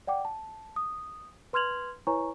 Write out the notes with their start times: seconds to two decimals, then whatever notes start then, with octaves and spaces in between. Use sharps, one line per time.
0.07 D5 F#5 G5 D6
0.25 A5
0.76 D#6
1.53 B4 C6 F6 G#6 F7 F#7
2.07 E4 B4 C#5 G#5 A#5 C#6